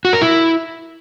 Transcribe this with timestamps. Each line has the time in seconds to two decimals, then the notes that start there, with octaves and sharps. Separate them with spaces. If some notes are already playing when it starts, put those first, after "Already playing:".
0.05 F#4
0.13 A#4
0.21 E4